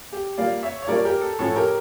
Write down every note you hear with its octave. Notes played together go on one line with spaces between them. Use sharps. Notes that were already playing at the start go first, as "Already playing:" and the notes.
G4
A#2 G3 A#3 D5 F5
C#5 E5
C#5
A#2 G3 A#3 A#4 D5
G4 A#4
A4
A2 F3 C#4 A4 C#5
G4 A#4